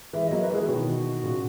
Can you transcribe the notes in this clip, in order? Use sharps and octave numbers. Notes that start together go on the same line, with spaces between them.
E3 G#3 E5
F#3 A#3 D#5
B4
E3 G#3 G#4
B2 D#3 F#4
E4
F#4
A#2 C#3